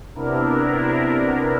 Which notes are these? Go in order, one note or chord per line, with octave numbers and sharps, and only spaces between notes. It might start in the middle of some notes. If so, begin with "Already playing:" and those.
C3 B3 D4 E4 A#4